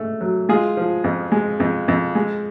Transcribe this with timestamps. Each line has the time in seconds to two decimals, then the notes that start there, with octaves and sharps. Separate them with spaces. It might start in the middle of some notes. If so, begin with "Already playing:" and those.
Already playing: G#2 A3
0.21 F#3
0.49 G#3 F4 G#4
0.77 F3
1.04 F2
1.32 G#3
1.60 F2
1.88 F2
2.15 G#3